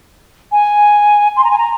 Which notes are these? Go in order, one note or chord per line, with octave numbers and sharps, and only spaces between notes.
G#5
C6
A#5
G#5
A#5